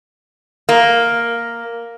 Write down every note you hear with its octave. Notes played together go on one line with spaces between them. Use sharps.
A#3